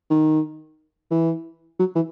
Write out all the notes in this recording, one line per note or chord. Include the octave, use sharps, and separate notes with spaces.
D#3
E3
F#3
E3